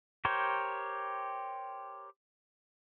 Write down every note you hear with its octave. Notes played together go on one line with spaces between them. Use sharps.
G4 A#4 C5 C#5